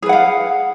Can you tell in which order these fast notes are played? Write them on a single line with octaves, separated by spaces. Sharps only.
G#4 B4 F#5 F5